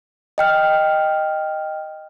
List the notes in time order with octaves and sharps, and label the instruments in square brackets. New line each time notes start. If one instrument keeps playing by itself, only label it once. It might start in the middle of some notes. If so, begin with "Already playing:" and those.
[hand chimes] D#5 G5 F6